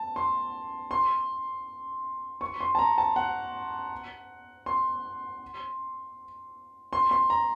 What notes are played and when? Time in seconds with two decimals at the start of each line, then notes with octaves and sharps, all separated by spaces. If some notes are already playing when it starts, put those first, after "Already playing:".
Already playing: A5
0.16 C6
0.91 C6
2.41 C#6
2.61 C6
2.75 A5
2.79 A#5
2.98 A5
3.16 F#5
4.66 C6
6.93 C6
7.11 C6
7.30 A#5